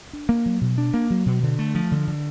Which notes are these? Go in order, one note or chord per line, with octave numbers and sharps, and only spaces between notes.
D4
A#3
F#3
B2
D4
A#3
F#3
B2
D3
A3
F3
D3
D3